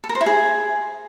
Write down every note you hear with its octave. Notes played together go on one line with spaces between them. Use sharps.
A4
A#4
C5
E4
G#4